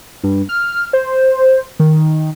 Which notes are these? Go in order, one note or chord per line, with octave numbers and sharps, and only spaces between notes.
G2
F6
C5
D#3